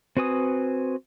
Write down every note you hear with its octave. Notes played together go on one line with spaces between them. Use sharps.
C4 F#4 B4 G#5 D#6